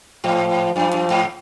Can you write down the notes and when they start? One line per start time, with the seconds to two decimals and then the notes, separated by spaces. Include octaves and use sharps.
0.24 G#2 F3
0.76 F#2 F3
0.93 F#2
1.10 G#2